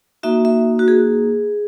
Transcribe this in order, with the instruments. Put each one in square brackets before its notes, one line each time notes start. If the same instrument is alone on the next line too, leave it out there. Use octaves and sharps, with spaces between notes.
[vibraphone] A#3 D#4 F#4 E5
E5
F#4
G#4